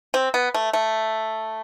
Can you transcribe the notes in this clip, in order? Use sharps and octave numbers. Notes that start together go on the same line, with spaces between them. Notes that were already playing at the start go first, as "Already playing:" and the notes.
C4
B3
A3
A3